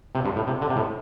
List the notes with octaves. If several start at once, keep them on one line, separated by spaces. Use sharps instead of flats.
C3
G2
A2
C3
D3
C3
A2